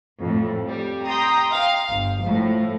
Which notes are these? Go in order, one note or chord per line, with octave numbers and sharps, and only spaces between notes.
F2 A2
G3
G5 A#5 C6 D#6
F5
G1
A2 F3